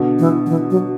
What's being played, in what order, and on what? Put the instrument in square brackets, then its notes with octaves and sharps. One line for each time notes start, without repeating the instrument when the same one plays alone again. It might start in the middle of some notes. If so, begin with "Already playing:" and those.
Already playing: [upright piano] B2 D3
[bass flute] E3
F#3
E3
F#3